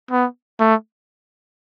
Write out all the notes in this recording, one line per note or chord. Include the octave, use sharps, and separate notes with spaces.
B3
A3